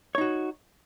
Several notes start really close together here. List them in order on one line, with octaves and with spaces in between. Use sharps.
C#5 D#4 F#4